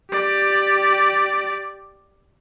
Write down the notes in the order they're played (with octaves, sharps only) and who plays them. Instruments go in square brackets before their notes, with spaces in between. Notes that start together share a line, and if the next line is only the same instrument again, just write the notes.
[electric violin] G4 D5